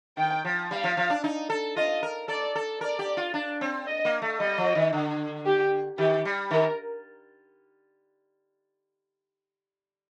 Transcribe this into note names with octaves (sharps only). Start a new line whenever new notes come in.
D#3 G5
F3
G3 F5
F3
F3
D4
D#4
A4
F4 D#5
A#4
A4 D5
A4
A#4 D5
G4
F4
D4
C4
D#5
A#3
A3
G3 D#5
F3
D#3
D3
G4
D#3 G4
G3
D#3 A#4